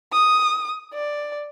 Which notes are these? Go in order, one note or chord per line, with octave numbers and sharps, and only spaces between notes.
D#6
D5